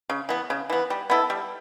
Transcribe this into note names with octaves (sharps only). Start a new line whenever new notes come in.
C#3
E3 B3
C#3
E3 B3
G3
B3 E4 A4
G3